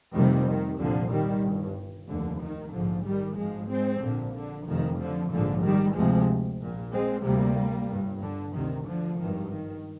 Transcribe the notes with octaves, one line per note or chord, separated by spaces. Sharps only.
F1 F2 C3 D#3 G3
D#3
C2 A#2 D3 F3
D#3 G3
G1 G2
F1 D#2 D3
D#3
A#1 G#2 D3 F3
D#3 G3
G#1 G#2 F3 G#3
G#3 C4
A#1 A#2 D3
D3
F1 F2 C3 D#3
D3 F3
A#1 G#2 D3 F3
D#3 G3
D2 C3 F3 G#3
A#1 A#2
G#3 C4
D2 C3 G3 A#3
G1 G2
D3
D2 C3 D#3
D3 F3
G#1 G2 D#3
D#3